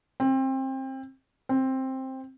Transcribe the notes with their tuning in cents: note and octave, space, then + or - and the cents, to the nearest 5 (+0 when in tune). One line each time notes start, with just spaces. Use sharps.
C4 +25
C4 +10